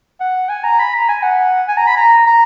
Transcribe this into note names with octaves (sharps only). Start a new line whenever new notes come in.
F#5
G#5
A#5
B5
A#5
G#5
F#5
G#5
A#5
B5
A#5
A#5